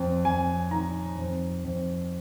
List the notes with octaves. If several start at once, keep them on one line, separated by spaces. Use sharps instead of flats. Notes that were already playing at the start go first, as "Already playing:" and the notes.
Already playing: F2
F2 G#5
D#3 A#5
F2
F2